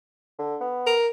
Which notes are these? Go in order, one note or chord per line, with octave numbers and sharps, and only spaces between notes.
D3
B3
A#4